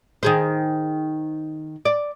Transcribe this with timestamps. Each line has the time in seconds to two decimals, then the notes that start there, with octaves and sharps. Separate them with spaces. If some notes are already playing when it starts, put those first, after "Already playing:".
0.23 D#3 G#4 C5
1.85 D5